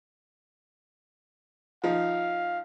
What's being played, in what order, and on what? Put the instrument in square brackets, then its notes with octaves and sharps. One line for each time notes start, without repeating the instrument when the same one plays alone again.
[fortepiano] F3 D#4 [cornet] F5